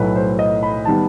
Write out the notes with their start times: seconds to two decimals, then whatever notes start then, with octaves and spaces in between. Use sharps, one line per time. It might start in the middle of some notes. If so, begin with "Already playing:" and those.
Already playing: B1 A2 F#3 A3 B4
0.16 C5
0.39 D#5
0.63 B5
0.85 D#3 G3 B3 A5